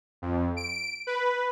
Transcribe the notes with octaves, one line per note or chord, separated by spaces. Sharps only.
F2
D7
B4